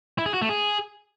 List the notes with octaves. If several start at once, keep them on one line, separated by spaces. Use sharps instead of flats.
E4
G#4
F#4
A3
G#4